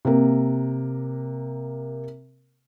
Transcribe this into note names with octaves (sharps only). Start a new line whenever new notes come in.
C3 A#3 A#4